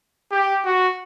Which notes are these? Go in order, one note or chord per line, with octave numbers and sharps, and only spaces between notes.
G4
F#4